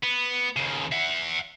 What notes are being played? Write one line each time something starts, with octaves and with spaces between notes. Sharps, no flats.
B3
D#2 C#3
E5 F#5